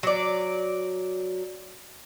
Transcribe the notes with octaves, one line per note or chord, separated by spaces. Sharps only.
F#3 D5